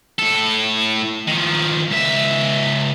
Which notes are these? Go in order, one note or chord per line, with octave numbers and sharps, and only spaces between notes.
A2 A4
D#3 F3
C#2 E5